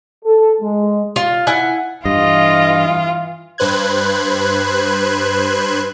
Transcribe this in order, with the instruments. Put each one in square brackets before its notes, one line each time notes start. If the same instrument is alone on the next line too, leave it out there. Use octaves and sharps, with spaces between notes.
[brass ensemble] A4
G#3
[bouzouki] F4
E4 F#5 G#5
[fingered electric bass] G2 [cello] E3 F4 [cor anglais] D#5
[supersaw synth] G2 B4 C5 F#6 G#6